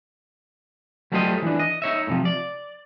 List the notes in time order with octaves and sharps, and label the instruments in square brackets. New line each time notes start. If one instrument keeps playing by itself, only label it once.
[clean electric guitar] F#3 G3 A3 F4 C5 D#5
E3 D4
D#5
D#4 C#5 E5
A2 C3 F3
D5